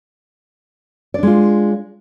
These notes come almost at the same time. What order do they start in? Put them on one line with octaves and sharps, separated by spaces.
D5 D4 G#3 F4